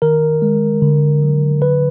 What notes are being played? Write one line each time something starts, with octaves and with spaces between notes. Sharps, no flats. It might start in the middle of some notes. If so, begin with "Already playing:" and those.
D#3 A#4
G#3
D3
F#3
D3 B4